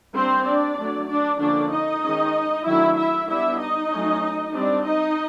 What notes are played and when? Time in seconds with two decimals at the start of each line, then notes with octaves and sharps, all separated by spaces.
0.14 G3 A#3 C4 D4 C5
0.45 D4 D5
0.77 F#3 A3 D4
1.08 D4 D5
1.40 D3 F3 A#3 C#4 D4 D5
1.71 D#4 D#5
2.03 D#3 G#3 C#4
2.66 D#3 F#3 A3 D4 E4 E5
2.97 E4 E5
3.29 G3 B3 D4 E4 E5
3.60 D#4 D#5
3.91 F#3 A3 C#4
4.54 G3 C4 D4 D5
4.85 D#4 D#5